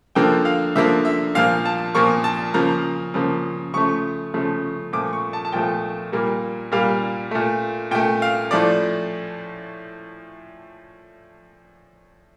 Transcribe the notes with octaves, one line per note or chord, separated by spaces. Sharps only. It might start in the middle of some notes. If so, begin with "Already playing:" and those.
D3 F3 A#3 G5
F5
D3 F3 A#3 E5
E5
A#2 F3 A#3 F5
A5
A#2 F3 A#3 C#6
A5
C#3 F3 A#3 A#5
C#3 F3 A#3
C#3 F3 A3 C#6
C#3 F3 A3
A#2 F3 A3 D6
C#6
A5
A5
A#2 F3 A3 G5
A#2 G3 A#3
A#2 G3 A#3 F5
A#2 A3
A#2 A3 G5
F5
A2 F3 A3 D5